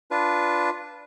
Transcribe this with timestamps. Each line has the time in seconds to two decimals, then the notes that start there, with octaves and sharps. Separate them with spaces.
0.11 D4 F4 B4